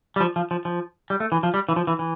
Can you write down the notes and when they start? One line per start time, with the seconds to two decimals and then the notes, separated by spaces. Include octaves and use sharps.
0.16 G3
0.20 F3
0.36 F3
0.51 F3
0.65 F3
1.10 G3
1.20 A3
1.32 E3
1.43 F3
1.54 G3
1.69 E3
1.76 F3
1.87 E3
1.99 E3